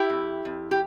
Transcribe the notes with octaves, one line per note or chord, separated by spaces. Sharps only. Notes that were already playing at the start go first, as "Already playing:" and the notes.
Already playing: E4 G4
F2
F2
G4